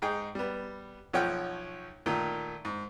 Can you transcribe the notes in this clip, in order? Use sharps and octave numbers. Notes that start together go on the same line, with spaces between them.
G#2 D#4 G#4 G5
G3 B3
B1 F3 C#5 F#5 G5 F6
A#2 D#3 A3
G#2